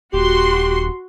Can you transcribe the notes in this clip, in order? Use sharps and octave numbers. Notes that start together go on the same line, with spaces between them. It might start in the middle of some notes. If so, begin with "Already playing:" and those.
D#1 F#4 G4 C6